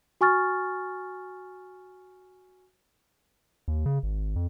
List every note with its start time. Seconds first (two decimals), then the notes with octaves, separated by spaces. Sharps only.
0.21 F#4 G#5 C#6 F6 A6
3.68 D#2
3.86 C#3
4.03 G#1
4.36 F2